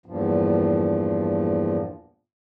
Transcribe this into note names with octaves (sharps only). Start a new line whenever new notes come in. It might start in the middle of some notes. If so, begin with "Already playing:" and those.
E2 G2 A#2 F3